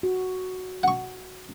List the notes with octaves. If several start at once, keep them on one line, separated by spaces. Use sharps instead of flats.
F#4
F#5 C#6